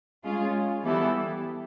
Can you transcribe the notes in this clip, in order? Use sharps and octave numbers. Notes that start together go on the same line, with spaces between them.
G#3 C#4 F4 G#4
E3 G3 B3 E4 A4